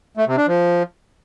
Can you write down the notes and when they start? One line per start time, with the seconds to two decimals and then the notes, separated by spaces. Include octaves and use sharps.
0.17 A3
0.27 C3
0.37 D4
0.47 F3